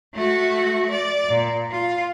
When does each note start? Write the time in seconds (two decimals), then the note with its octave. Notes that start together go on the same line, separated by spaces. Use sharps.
0.14 A3 F#4
0.90 D5
1.29 A#2
1.71 F4